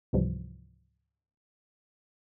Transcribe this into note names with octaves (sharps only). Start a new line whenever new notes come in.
C#2 G#2 C3 E3 F3 G3